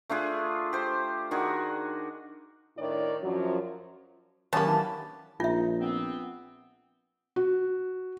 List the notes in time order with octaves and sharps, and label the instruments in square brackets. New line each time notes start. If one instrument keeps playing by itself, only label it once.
[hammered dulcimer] A3 D4 F4 G#4
G4 C5
D#3 D4 F#4 G#4
[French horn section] A2 D#3 D4 E4 C#5 D5
F#2 F3 F#3
[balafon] D#3 F#3 G#5 [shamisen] A#3 C#4 [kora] B3 G4 [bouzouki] A5
[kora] E3 D4
[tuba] A#1 [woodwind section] D#4 [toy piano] F4 E5
[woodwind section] B3 C4
[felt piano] F#4